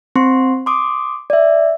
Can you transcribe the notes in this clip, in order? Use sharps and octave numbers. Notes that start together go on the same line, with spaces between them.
C4 C6
C6 D6 D#6
D5 E5